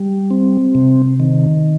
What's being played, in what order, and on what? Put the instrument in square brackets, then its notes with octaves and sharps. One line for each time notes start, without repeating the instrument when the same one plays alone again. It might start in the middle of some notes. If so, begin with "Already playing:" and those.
Already playing: [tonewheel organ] G3
C4
C3
D#3